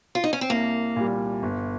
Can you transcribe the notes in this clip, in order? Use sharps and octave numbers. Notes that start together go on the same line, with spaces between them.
F4
D#4
C#4
C4
C2 A#3
A#2 G3
G1